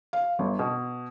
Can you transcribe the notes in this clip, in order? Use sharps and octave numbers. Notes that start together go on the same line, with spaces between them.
F5
G1
B2